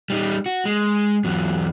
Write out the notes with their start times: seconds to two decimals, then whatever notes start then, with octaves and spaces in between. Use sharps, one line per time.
0.10 G3 D#4
0.46 F#4
0.65 G#3
1.25 E2 F#3